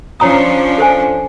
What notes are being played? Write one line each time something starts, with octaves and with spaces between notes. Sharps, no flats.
F3 C#4 D4 C#5 A#5 D#6
A4 C5 G#5